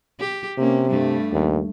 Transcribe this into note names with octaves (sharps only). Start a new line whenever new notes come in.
G4
C3 A#3 C#4
G2 G3 A3
D#2